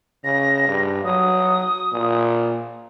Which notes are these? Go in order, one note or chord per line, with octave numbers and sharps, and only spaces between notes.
C#3 A#6
G2
F#3 D#6
A#2